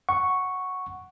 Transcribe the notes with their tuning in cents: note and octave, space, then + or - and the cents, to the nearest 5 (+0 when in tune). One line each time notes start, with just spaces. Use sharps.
F#5 +0 C#6 +0